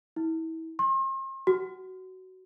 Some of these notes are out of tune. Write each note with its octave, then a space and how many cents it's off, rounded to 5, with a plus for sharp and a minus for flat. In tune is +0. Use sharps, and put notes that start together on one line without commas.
E4 -30
C6 +40
F#4 +15